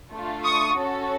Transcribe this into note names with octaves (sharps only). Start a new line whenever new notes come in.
A3 D4 F4
C#6 D#6
C#4 F#4 A4